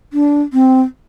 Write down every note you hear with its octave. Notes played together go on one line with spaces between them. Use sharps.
D4
C4